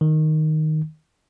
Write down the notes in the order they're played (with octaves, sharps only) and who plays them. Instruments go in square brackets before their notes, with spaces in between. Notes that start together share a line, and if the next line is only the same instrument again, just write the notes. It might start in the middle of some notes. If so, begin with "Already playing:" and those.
[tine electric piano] D#3